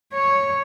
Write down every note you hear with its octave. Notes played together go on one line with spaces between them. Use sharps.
C#5